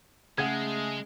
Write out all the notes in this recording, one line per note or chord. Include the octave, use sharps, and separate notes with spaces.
C#3 G#3 A3 G#4 F#5 G#6